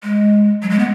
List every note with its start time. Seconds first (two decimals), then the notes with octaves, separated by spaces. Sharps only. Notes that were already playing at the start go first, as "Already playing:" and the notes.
0.03 G#3
0.62 F#3
0.70 G#3
0.79 B3